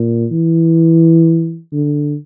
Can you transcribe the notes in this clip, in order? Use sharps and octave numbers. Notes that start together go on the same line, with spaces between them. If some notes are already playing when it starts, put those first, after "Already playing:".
Already playing: A#2
E3
D3